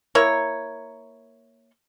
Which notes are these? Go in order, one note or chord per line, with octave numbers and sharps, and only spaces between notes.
A#3 E4 A#4 C#5